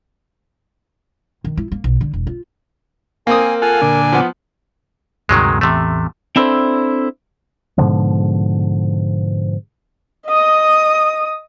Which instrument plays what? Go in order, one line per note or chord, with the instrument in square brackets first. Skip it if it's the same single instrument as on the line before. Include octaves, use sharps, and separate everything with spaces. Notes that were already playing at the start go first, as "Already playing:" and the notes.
[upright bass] D#3
E4
A#3
B1
D3
E1
F4
[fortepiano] A#3 C4 D#6 [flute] A#4 [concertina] G#5
[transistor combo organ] F4 A4 F#5 [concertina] G#5
[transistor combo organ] A#2 D3 D4
[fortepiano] F3 B3
[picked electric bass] D2 G2 C3 [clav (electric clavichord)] D#3 F#3 G#3
[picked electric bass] A1 E2 [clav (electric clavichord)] C3 A3
[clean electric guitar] C4 D4 E4 A4 A#4 C5
[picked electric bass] G#2 B2 D3 F3
[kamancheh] D#5 D#6